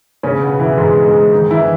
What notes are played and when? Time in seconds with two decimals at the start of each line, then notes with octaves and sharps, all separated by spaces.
0.23 C#3 C#4
0.42 B2 B3
0.60 E3
0.78 G#2 G#3
1.05 G#2 G#3
1.32 D#3 D#4
1.51 E3 E4